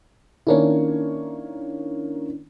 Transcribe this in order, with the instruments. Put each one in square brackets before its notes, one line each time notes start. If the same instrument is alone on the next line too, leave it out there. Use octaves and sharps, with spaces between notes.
[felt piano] D#3 A#3 C#5 [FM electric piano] C#4 D4 E4